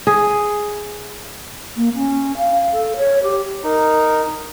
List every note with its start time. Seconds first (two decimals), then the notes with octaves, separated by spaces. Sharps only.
0.07 G#4
1.77 A#3
1.95 C#4
2.37 F5
2.72 A4
2.97 C#5
3.23 G4
3.64 D#4 A#4